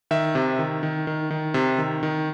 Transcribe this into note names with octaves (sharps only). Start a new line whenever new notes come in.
D#3 E5
C3
D#3
D#3
D#3
D#3
C3
D#3
D#3